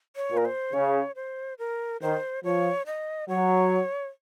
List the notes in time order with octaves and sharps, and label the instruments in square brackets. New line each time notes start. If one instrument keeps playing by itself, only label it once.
[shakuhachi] C#5
[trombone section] A#2
[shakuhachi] A#4
C5
[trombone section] C#3 [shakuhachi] C#5
[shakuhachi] C5
A#4
[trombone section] D#3 [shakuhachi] C5
[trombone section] F3 [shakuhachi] C#5
[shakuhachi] D#5
[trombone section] F#3 [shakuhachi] C#5